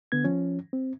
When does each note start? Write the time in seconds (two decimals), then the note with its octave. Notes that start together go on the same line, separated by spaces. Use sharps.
0.12 D3 B3 G#6
0.24 F3 C#4
0.73 C4